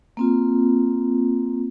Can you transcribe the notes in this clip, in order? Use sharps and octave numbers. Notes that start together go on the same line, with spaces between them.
A#3 C4 F4